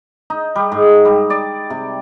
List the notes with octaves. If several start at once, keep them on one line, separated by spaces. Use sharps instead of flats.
D#4
G3
G#2
G3
D5
C3